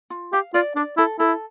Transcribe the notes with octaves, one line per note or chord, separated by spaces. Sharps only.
F4
G4 F5
F4 D5
D4 D5
E4 A4
E4 A4